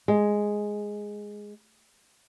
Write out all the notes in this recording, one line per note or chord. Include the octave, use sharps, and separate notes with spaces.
G#3